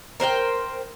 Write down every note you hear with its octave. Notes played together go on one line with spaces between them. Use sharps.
A#4 C5 F#5 G5